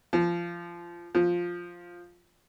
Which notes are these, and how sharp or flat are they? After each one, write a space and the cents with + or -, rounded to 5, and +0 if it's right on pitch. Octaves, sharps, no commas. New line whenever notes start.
F3 -20
F3 +5